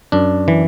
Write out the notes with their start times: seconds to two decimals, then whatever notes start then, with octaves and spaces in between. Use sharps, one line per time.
0.12 F#2 D4
0.48 E3